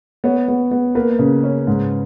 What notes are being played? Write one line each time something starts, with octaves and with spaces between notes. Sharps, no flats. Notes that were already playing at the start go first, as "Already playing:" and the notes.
B3 C#5
B3
B3
A#3 B4
C#3
C#4
G#2